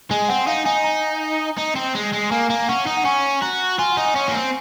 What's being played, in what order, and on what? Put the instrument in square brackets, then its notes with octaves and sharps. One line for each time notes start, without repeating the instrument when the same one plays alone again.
[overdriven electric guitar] G#3 [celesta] G#5
[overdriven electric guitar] C4 [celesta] F#5
[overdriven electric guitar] D#4 [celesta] F5
[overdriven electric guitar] D#4 [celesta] G#5
[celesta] A#5
[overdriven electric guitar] D#4
C4
G#3
G#3
[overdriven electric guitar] A#3 [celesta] G#5
[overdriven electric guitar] A#3
[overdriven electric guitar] C#4 [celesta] F#5
[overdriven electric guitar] D#4
[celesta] F#5
[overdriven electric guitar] C#4 [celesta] G#5
[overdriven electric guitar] F#4 [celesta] A#5
[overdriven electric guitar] F4 [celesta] G#5
[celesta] F#5
[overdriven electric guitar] D#4
[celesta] G#5
[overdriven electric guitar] C#4
A#3
C4